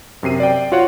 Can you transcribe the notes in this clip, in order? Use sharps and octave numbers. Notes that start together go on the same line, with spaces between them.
F#2 C3 C7 D#7
D5 G5
F4 F#4 C#5 F#5